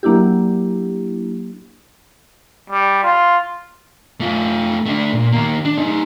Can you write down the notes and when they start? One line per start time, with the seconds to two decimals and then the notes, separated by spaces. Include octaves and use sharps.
0.03 F#3 A#3 D4 E4 G4
2.70 G3
3.03 F4
4.20 A3 F4
4.86 A3 D4
5.13 A#2
5.32 D#3 A#3
5.65 D4
5.77 A3 D#4